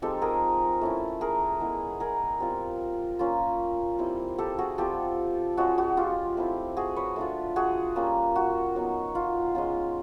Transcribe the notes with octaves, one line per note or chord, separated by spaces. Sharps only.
F3 G#3 C4 D#4 G4 A4
G#4 A#4
A3 C#4 E4
G#4 A#4
G#3 B3 E4
G#4 A#4
G3 C4 F4
A#3 C#4 F4
G3 C4 E4
G4 A4
F#4 G#4
G3 C4 F4 G4 A4
G#3 C#4 F4 F#4 G#4
F#4
F4 G4
A3 C4 E4
F#4 G#4
B4 C#5
A3 D4 F4
F#4 G#4
G3 A#3 C#4 F4
F#4
F#3 B3 D#4
F4
G#3 C#4 F4